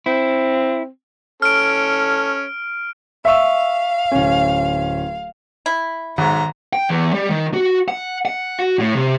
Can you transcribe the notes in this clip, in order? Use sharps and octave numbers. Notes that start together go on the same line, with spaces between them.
C4 E4
C#4 A4 F6 D7
E5 F5 C#6 E6
D1 C#4
E4
B1 G#2 D#3 A#5
G5
E2
G3
D#3
F#4
F#5
F#5
F#4
A2
C3